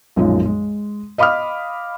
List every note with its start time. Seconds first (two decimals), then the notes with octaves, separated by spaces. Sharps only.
0.16 B1 F#2 A#2 F3 G#3
0.46 G#3
1.18 D#5 F5 B5 D6 D#6 F6